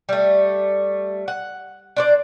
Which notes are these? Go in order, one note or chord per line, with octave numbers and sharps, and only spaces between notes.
G3 A3
F#5
D4 C5 D5